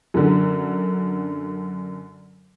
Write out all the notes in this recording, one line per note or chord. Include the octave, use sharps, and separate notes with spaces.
F#2 D3